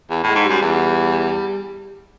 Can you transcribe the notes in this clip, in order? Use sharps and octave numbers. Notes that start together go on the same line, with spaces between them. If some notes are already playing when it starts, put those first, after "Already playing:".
E2
A2
G#3
G#2
F#2 G3
E2